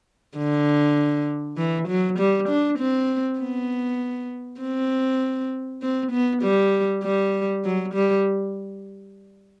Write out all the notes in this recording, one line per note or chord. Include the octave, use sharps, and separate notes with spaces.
D3
E3
F#3
G3
D4
C4
B3
C4
C4
B3
G3
G3
F#3
G3